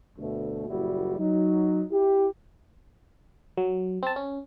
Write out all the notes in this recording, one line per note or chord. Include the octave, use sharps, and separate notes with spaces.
D2 B2 A3
F#1 A#2 G3 E4 F#4
F#3 D#4
E4 G4
F#3
C4 A5
C#4